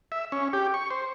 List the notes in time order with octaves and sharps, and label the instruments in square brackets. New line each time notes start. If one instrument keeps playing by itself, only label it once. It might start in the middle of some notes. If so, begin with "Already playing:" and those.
[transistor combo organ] E5
C#4
G4
C#6
C5